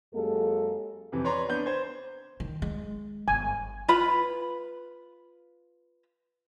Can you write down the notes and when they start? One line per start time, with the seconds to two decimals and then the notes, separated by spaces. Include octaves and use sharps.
0.14 F#2 G#3 A#3 G4 A4
1.12 F2 C3 E3
1.24 B4 C#5 D5 A#5 C6
1.49 B3 D4 G6
1.66 C5 G#6
2.40 D#3
2.62 G#3
3.28 G1 G#5
3.88 F4 B4 B5